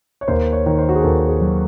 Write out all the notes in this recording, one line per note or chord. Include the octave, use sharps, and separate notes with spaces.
C#5
D#2 C5
C#5
D#3
C5
F#4
G#4
D#2 A4
G#4
F#3